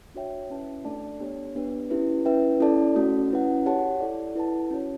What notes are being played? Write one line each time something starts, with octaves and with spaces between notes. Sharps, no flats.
D4 F#4 C#5 E5 G5
C#4 E4 B4 E5 A5
A3 D4 A4 D5 A5
B3 D4 G4 C#5
B3 D4 G4 B4
C#4 E4 G4 B4
C#4 E4 B4 E5 G5
C#4 E4 A4 D5 A5
A3 C#4 F#4
C#4 E4 B4 F#5
G4 C#5 F#5 A5
E4 A4 D5
E4 B4 F#5 A5
C#4 F#4 C#5